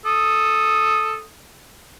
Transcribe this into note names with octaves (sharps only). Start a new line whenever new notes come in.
A4 D#6